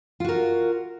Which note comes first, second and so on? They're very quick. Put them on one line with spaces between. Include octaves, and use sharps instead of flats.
F4 F#4 A#4